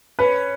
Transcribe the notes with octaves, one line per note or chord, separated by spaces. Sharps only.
C#4 B4